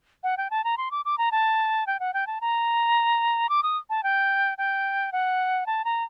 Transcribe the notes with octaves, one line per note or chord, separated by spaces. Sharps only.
F#5
G5
A5
A#5
C6
D6
D6
A#5
A5
G5
F#5
G5
A5
A#5
D6
D#6
A5
G5
G5
F#5
A5
A#5